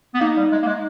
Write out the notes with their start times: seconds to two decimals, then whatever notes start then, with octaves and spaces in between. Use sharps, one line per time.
0.14 B3
0.20 A#3 D#4
0.37 G3
0.52 G#3
0.62 A#3
0.67 G#3